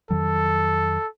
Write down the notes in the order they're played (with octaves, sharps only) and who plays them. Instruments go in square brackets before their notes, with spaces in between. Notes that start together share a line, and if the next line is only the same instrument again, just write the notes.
[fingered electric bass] F2 D#3 F#3 [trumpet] A4